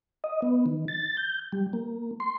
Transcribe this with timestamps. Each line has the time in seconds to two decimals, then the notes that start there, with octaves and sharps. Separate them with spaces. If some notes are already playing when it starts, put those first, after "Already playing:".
0.24 D#5
0.42 B3
0.66 D#3
0.88 A6
1.17 G6
1.52 G3
1.73 A#3
2.20 C6